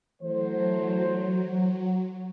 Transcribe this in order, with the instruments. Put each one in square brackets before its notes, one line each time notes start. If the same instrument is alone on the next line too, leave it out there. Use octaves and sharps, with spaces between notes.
[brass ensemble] E3 A3 C5 [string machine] F#3